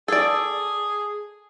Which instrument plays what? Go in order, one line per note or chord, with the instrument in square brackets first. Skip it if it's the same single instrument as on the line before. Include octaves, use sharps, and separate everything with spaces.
[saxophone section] G#4 [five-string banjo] A4 D5